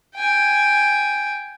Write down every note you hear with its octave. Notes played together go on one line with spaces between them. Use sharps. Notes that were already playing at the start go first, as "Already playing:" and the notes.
G5 G#5